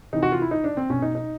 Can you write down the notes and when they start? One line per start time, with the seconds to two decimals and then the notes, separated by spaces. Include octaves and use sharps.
0.13 C3 E3 D#4
0.23 F#4
0.32 F4
0.42 E4
0.51 D#4
0.64 D4
0.77 C4
0.90 B2 C#4
1.02 D#4
1.15 D#4